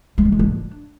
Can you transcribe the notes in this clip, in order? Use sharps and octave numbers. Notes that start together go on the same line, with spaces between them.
G#3
F3
G#3
D4